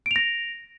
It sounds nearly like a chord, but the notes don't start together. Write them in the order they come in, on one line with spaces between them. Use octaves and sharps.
D7 F7 A#6